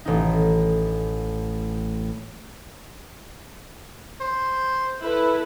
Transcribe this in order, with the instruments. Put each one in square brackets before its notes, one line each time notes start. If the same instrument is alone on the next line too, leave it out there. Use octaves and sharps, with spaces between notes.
[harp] A1 D#4
[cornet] C5
[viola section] E4 A4 B4